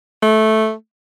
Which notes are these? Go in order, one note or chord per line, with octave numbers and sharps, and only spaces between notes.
A3